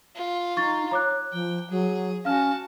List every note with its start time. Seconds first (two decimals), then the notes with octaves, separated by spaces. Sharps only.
0.16 F4
0.57 D#4 C#6 A6
0.91 C#5 A#5 D6 F#6
1.32 F3 G5
1.70 F#3 G#4
2.25 C#4 F#4 F5 A5 F6